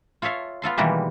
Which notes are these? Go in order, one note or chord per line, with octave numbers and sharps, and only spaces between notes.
F4 A4 C#5 E5 F5
B3 F4 A4 C6
B2 D#3 E3 G3 G#3 A#3